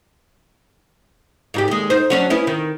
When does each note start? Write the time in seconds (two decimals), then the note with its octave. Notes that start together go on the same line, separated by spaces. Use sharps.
1.54 G#2 D#4 G4
1.68 D#2 G#3
1.90 D#4 C5
2.10 F#3 C#4 D4
2.30 B3 C#4 E4
2.47 D#3